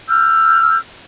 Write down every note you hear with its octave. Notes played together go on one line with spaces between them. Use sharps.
E6 F6 G6